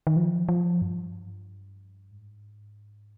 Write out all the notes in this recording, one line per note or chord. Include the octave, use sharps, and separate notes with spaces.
D#3
F3
F3
G2
G#2